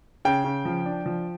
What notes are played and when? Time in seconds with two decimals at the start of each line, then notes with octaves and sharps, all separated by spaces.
0.25 C#3 G5
0.44 C#3
0.65 F3
0.86 D4
1.06 F3